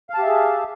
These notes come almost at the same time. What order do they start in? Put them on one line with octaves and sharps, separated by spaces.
F5 A5 G4 E5 G#4